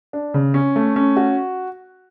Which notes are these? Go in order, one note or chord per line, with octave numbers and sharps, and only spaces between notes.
D4
C#3
C#4
A3
C#4
F#4